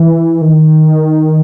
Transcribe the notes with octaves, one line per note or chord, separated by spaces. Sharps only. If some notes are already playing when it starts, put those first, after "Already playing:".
Already playing: E3
D#3